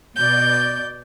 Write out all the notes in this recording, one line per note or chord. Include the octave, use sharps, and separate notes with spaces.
B2 D5 G6